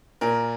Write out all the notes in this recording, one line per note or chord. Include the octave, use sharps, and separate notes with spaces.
A#2 A#4